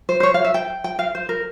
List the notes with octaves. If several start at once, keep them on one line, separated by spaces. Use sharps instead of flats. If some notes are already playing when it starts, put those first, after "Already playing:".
C5
C5
C#5
F5
E5
G5
G5
F5
C5
A#4